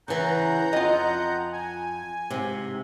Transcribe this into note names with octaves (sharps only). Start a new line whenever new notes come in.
C#3 E3 F#5 A#5 G6
F2 F4 D#5
G#5
G#2 C3